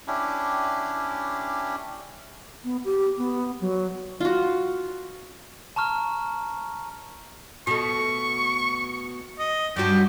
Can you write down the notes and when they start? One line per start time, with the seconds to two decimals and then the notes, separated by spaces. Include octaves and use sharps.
0.07 C#4 D4 E4 G4
2.64 B3
2.85 G4
3.18 B3
3.61 F#3
4.20 F4 F#4
5.76 A5 A#5 C#6 F6
7.67 B2 A3 C#6
9.39 D#5
9.76 G2 F#3 F#4 G4